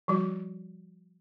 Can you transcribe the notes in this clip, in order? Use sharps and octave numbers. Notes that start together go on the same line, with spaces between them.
F3 G3 F#4